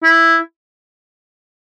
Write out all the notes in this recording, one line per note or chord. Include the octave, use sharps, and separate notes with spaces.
E4